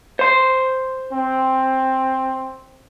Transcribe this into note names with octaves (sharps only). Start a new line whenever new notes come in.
C5 C6
C4